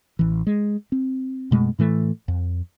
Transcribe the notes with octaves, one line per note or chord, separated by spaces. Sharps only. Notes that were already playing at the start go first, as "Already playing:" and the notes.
A1 E3
G#3
C4
F#2 B2 G#3 A3
A2 E3 A3
F2